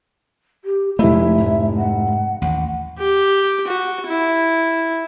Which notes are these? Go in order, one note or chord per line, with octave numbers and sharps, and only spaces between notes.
G4
F1 F3 G#3 A3 E4 E5
G#2
F#5
A1 D#2 F#5
G4
F#4
E4